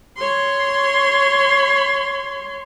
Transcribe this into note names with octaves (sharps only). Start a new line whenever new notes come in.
C#5 C6